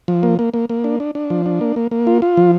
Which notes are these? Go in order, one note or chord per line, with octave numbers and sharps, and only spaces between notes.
F3
A#3
A#3
A#3
A#3
D4
D4
D4
F3
D4
A#3
A#3
A#3
F4
F4
F3